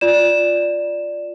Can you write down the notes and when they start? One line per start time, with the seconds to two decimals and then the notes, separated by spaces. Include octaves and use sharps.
0.01 F4 D5 E7